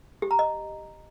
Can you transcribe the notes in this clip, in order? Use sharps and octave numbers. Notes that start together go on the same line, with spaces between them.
G4
A#5
D#5